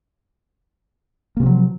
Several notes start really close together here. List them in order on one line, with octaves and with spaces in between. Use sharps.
A#3 C3 F3 F#3